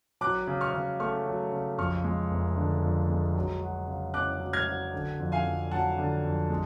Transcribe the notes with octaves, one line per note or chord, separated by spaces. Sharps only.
F#3 D6 F#6
C#3
C#6 F6
C#3
A3 C#6 F6
F#3
C#3
F2 C#6 F6
G#3
F1
D3
F2
G#3
F#3
F#4
C#3
C#4 D6 F#6
F#3
F6 G#6
F#4
D3
F2
F5 G#5
F2
F#3 F#5 A5
D3
F2
G#3